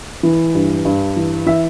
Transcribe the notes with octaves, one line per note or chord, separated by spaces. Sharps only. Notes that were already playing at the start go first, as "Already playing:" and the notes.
E3
G2
G2
E3
E3 E5